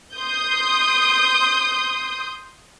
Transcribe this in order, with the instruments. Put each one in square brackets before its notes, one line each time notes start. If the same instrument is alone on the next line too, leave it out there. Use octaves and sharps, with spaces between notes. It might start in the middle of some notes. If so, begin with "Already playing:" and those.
[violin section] C6 D#6 G6